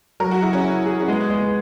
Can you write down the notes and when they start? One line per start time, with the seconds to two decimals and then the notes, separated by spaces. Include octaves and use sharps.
0.20 F#3 A#4
0.31 F#4
0.42 E4 G#4
0.53 C#4
0.64 E4
0.86 G#4
1.01 C#4
1.08 G#3 B3
1.30 G#3 B3
1.41 B3